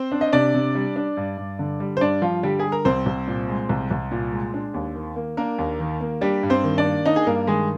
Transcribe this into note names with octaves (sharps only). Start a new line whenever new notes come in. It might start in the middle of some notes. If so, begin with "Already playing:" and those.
Already playing: C4 C5
D4
D#5
C3 D4 D5
C3
G3
D4
G2
G2
D3
G3
C5
G2 D4 D5
G2 F3 F4
D3 G3 G4
G#4
G3
A#4
C2 C4 C5
C2
A#2
G#3
C2
C2
A#2
G#3
D4
D#2
D#3
A#3
A#3 D4 A#4
D#2
D#3
A#3
G3 D4 G4
G2
C4 C5
D#3
D4 D5
A#3
D4 D#4 D#5
G#4
G2 A#3 A#4
D#3 G#3 G#4